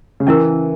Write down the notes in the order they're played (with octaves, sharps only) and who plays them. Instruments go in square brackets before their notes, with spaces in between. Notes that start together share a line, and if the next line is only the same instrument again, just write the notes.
[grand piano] C#3
[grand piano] E3 [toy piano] C#4 E4 A#4